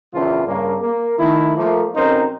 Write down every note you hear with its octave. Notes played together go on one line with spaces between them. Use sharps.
A#1 E2 C#3 E3 F3 F4
G2 C#3 A#3
A#3
D#3 A3 E4
F3 A3 A#3
B1 C4 C#4 D#4 A#4 C5